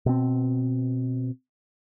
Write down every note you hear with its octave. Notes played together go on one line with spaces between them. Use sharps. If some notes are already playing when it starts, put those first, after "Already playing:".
B2 C4